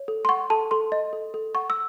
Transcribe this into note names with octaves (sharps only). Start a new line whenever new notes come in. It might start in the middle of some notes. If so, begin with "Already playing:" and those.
Already playing: C#5
A4
C6
F#5 C#6
A4 A5
A4 C6
D#5
A4
A4
F#5 C#6
E6